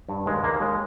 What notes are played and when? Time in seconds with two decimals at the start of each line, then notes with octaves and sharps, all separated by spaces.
0.09 G2
0.26 D#2 G#3
0.44 D#2 A#3
0.60 D#2 G#3